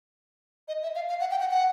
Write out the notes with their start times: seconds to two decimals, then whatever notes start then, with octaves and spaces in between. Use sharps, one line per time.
0.68 D#5
0.83 E5
0.95 F5
1.09 F5
1.20 F#5
1.31 G5
1.40 F#5
1.51 F#5